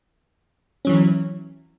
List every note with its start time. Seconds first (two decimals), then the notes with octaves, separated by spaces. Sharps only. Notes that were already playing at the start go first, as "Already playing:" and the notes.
0.85 E3 F#3 C#4